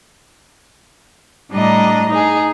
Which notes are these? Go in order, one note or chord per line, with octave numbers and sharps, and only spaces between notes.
A2 G3 D4 D#5 A#5
D#4 G#4